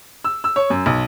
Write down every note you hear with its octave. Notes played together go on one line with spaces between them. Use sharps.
E6
E6
C#5
F#2
B1